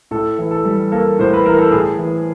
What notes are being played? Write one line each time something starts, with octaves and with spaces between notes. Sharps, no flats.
A2 A4
E3
A4
G3
A#3 A4
A2 C5
B4
E3 A#4
A4
A2 G#4
E3